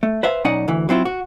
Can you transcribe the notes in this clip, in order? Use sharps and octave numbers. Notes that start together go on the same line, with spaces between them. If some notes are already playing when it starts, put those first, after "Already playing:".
A3
B4 C5 E5 F5
B1 C#4 D#4 D5 D#5 F#5
D2 E3
F#3 C4 E4 F4
F#4